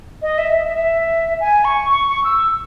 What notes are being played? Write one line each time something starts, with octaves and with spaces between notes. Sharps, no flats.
D#5
E5
E5
E5
G#5
C#6
C#6
C#6
E6